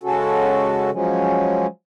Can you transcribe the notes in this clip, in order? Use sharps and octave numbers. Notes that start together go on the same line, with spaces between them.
C#3 G#3 C#4 F#4 A4
F3 F#3 G#3 C#4